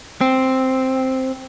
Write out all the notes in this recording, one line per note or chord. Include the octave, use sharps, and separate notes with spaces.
C4